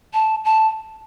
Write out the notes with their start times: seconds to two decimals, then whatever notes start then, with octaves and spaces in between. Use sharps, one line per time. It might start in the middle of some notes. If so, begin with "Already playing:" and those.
0.14 A5
0.45 A5